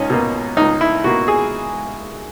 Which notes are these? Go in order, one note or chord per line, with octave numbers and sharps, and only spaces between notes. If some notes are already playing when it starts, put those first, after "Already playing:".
Already playing: C#2 C#4 D#4
B2 A#3
C#2 D#4
E4
B2 A#3 F#4
G#4